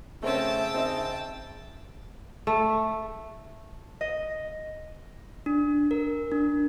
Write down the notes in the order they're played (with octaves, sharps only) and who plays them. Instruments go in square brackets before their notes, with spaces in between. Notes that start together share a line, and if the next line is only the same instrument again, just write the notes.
[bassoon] C#3 [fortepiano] A3 C4 C#4 [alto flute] E5 [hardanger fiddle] G5 A5
[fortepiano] C4 D#4
[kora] A3
[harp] D#5
[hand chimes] D4
A#4
D4